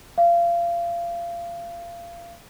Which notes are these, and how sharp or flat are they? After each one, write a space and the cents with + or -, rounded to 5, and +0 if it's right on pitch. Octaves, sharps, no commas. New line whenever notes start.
F5 -25